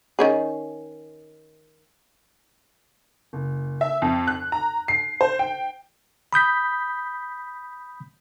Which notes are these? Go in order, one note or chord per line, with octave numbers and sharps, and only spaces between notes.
D#3 C#4 G#4
F#1
E5
F2
F#6
A#5
C7
C5
G5
B5 D#6 G6 B6